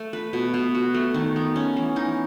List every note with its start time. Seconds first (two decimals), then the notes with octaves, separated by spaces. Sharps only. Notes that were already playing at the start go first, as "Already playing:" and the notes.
Already playing: A3
0.13 B4
0.33 B2
0.54 B2
0.75 F#4
0.94 A3
1.14 D#3
1.36 B3
1.56 C#4
1.77 E3
1.96 D#4